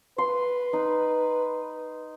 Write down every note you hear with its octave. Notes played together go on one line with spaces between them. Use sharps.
B4 C6
D#4